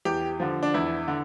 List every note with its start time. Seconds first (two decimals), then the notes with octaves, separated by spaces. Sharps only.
0.05 E2 G4
0.40 D3 F3
0.63 D4
0.74 E2 E4
1.08 D3